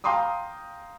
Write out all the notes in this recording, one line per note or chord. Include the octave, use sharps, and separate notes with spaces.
F5 G5 A#5 C6 D6 D#6